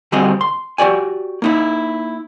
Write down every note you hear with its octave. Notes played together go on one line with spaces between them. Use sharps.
D3 G3 C4 F#4 G#4 D#5
C6
F#4 G4 D5 G#5
A#3 D#4 E4